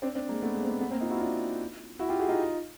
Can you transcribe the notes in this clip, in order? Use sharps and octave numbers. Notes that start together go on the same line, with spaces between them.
C4 D4
C4 D4
G#3 A#3
A3 B3
G#3 A#3
C4
A3 B3
A3 B3
A#3 C4
D#4 F4
E4 F#4
F4
D4 E4
E4 F#4
F4 G4
F#4 G#4
D#4 F4